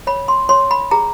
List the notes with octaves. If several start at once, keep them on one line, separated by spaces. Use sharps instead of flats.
C#5 B5
C6
C#5 C6
B5
G#4 A#5